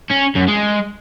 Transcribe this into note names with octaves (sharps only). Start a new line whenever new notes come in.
C#4
F#2
G#3